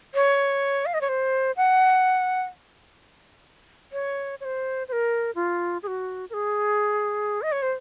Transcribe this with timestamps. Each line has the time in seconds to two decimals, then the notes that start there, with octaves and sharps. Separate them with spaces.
0.14 C#5
0.86 F5
0.94 D#5
1.01 C#5
1.09 C5
1.57 F#5
3.93 C#5
4.41 C#5
4.45 C5
4.88 C5
4.92 A#4
5.35 F4
5.83 G#4
5.87 F#4
6.30 A#4
6.33 G#4
7.42 D#5
7.52 C#5
7.62 C5